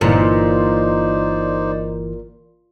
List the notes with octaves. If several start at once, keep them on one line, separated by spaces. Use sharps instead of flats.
G1 A#2 E3 D#4 C5 D5